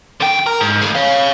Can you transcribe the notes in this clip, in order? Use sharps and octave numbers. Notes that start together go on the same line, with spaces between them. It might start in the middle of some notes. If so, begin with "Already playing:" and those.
D3 G5
A#4
G#2
D2 G#4
C#5 F5